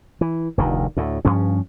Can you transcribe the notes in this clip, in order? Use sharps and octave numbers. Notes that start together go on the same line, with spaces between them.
E3
F1 D2 D#3
D2 A2
G2 F3 C#4